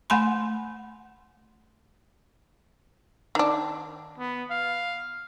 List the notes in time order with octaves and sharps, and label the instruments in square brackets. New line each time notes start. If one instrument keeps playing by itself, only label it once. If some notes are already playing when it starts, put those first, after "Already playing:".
[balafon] A3 F#5 G#5 B5 C6
[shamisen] D#3 D4
[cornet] B3
F5